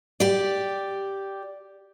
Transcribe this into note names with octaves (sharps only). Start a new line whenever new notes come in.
G4 D5